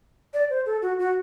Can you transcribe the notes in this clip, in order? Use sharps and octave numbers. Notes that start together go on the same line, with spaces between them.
D5
C5
A4
F#4
F#4